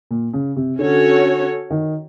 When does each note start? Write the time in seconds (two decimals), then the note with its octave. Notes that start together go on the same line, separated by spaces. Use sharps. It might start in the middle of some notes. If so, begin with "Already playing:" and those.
0.11 A#2
0.33 C#3
0.56 C3
0.79 D3 C#4 F#4 A4 C#5
1.71 D#3